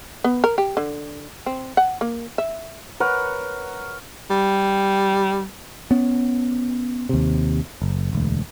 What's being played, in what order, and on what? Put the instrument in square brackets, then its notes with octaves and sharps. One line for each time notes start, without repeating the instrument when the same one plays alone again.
[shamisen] B3
A#4
G4
D3
C4
F#5
A#3
E5
[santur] A#4 B4 C#5 F#5
[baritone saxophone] G3
[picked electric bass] B3 C#4
D#2 C3
F#1
E1 D2